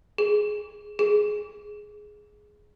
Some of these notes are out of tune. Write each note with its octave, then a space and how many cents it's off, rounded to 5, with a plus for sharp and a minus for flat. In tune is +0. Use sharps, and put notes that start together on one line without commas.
G#4 +10
G#4 +10